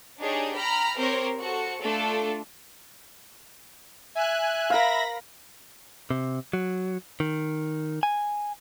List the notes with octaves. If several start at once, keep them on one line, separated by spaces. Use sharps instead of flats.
D4 D#4 G4 G#4 C#5
G5 A#5 B5 F6
C4 G4 A#4 C5 C#5
F#4 A4 C5 C#7
A3 D4 F4 A4
E5 G#5 F#6
A#4 F5 B5 A#6
C3
F#3
D#3
G#5